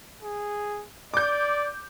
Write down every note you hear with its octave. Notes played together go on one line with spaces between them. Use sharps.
G#4
D5 D6 G6